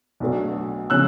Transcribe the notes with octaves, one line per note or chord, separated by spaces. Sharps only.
B1 B2 F#3 A3 D4
C#3 F3 G#3 C#4 E6 F#6